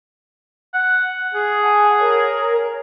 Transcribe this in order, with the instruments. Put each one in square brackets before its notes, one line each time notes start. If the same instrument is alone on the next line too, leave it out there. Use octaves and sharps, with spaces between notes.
[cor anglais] F#5
G#4
[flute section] F#5 G#5 A5
A#4 C#5